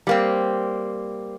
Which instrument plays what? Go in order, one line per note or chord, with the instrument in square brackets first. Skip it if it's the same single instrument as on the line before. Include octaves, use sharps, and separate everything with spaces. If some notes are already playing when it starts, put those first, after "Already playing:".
[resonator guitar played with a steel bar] G3 A#3 C4